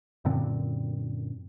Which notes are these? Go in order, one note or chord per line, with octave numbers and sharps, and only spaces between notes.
F#2 A#2 D3 C4